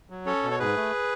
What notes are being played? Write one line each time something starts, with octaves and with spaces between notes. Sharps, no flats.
F#3
C#4 A4 C#5
B2
C#5
G#2 G#4 B4
A3